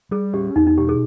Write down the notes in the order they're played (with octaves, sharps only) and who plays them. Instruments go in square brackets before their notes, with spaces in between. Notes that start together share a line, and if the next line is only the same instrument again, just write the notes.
[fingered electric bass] G3 [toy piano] G#4
[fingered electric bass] C#4 [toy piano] G4
[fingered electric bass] E2 [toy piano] D#4
[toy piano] D#4
[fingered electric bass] B2 [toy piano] G4
[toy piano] G#4